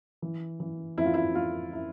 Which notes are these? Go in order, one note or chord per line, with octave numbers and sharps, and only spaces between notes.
E3
E3
F2 E4
F4
E4
F2 F4
E4